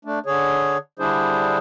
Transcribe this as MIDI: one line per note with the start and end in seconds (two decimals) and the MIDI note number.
0.05 0.19 57
0.05 0.19 62
0.26 0.77 50
0.26 0.77 68
0.26 0.77 73
0.99 1.58 50
0.99 1.58 55
0.99 1.58 62
0.99 1.58 64
0.99 1.58 68
0.99 1.58 72